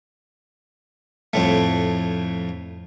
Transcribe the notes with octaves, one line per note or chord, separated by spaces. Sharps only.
F2 A2 A3